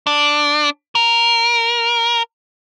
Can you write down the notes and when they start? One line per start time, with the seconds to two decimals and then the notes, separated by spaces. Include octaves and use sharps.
0.07 D4
0.95 A#4